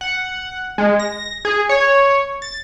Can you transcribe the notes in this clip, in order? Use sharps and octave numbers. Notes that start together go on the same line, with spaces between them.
F#5
G#3
A#6
G#4
C#5
A6